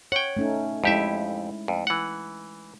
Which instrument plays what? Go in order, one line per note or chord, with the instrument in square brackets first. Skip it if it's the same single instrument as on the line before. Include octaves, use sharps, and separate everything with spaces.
[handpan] C#5 [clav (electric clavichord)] F#5 G5
[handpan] A3 C#4 D#4
[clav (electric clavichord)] F2 G4 E5 [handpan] G#3 E4
[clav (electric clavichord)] F2
E3 F#5